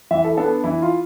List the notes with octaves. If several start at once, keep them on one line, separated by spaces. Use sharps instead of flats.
E3 E5
A4
B3 D4 A4
E3 E4
F4